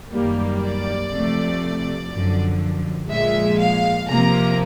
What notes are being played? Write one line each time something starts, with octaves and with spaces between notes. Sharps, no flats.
F#2 D#3 G3 A#3
D5
C3 F3 A3
F#2 D3 F3
A#2 F3 G#3 E5
F5
C3 F3 A#3 A#5